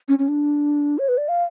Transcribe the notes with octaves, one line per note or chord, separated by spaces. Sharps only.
C#4
C#4
D4
C#5
B4
D5
F5